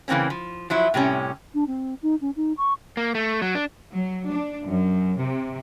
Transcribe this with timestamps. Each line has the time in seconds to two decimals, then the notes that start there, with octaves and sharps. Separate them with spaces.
0.08 C#3 E3 A#3 C4 C#4
0.30 F3
0.70 F3 F#3 E4
0.94 A2 C3 G3 C#4
1.54 D4
1.67 C4
2.02 D#4
2.21 C#4
2.36 D#4
2.57 C#6
2.97 A#3
3.15 A3
3.42 F#3
3.55 D4
3.91 F#3
4.27 D4
4.67 F#2
5.18 C3